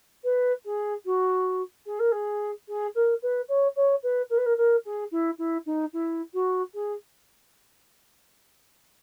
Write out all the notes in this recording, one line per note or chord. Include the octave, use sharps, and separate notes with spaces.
B4
G#4
F#4
G#4
A#4
G#4
G#4
A#4
B4
C#5
C#5
B4
A#4
B4
A#4
A#4
G#4
E4
E4
D#4
E4
F#4
G#4